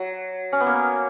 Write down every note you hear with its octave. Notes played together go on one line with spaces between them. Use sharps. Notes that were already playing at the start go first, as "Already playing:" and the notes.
Already playing: F#3
C#4
B3
A#3